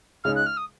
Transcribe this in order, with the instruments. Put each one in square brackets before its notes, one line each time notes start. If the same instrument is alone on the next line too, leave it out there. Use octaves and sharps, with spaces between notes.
[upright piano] C#2 C#3 G#3 D#4 [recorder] F6
[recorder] F#6
F6
D#6